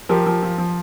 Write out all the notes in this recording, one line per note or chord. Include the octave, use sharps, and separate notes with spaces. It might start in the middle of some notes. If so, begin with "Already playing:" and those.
F3 G4 A#4
F3
F3
F3